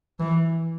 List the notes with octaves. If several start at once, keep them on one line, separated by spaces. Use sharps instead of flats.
E3